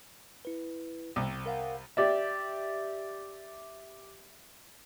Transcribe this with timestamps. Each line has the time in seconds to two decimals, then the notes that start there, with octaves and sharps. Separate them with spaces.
0.45 E4 B4
1.16 C2
1.46 A#4 F5 F#5
1.97 G4 D5 E5